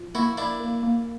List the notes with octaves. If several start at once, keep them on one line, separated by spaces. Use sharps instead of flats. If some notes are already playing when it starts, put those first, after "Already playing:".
Already playing: F3
A#3 E4 F#4
A#3 D4 E4
A#3
A#3